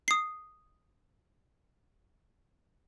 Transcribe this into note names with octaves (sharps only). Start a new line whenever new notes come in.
D#6 C7